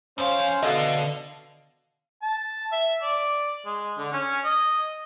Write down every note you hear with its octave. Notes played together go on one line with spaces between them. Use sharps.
F2 C#4 C5 F5
B2 D3 A4 D#5 F5
A5
E5
D5
G#3
D3
C#4
D#5